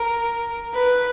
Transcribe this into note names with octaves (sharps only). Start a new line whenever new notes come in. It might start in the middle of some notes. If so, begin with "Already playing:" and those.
Already playing: A#4
B4